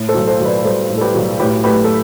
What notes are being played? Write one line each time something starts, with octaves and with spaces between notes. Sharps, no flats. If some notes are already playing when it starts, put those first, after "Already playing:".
Already playing: A2
A4 C5
B1
A4 C5
B1
B4 D5
B4
G3 A4 C5
A2
A4
G4 B4
B1
A2 G4 B4
A3 G4 B4
A4